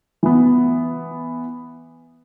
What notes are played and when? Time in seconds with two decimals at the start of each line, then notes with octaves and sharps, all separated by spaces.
0.23 E3 B3